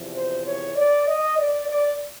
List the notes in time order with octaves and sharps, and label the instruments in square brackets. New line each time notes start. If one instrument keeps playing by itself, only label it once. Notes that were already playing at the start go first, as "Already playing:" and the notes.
Already playing: [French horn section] E2 C3 F3
C5
C#5
D5
D#5
D5
D5